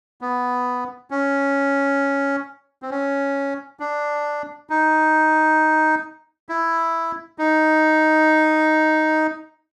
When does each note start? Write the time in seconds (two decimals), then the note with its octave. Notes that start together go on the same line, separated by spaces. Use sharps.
0.21 B3
1.11 C#4
2.82 C4
2.91 C#4
3.80 D4
4.70 D#4
6.49 E4
7.38 D#4